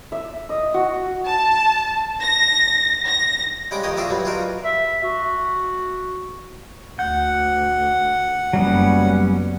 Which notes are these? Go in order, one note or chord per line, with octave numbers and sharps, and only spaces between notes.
E5
D#5
F#4
A5
A#6
A#6
C#3 G3 G#3 D5 F#5 D6
F2 D#3 G4 C#5 D#5 D#6
D4 F4 F#4 G#4 D5 E5
B2 F#3 G3
D4 D#4 F4 F#4 A#4
E5
F#4
D2 F#5 G6
F#1 F#3 G3 B3 C#4